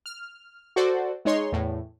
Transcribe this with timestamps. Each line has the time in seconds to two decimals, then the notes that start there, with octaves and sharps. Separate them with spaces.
0.06 F6
0.76 F#4 A4 C5 D5
1.25 G#3 D#4 C#5 C6
1.52 E2 A2